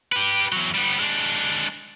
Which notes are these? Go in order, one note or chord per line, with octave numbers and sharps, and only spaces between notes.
G4 B4
E2 F#3
G3 B3
G#3 D4